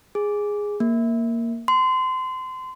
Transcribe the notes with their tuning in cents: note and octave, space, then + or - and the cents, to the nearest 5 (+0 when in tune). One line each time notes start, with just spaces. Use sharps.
G#4 -5
A#3 -5
C6 -25